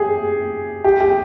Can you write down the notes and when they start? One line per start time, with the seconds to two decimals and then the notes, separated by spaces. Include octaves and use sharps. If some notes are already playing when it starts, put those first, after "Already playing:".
Already playing: G4 G#4
0.84 G4
1.01 G4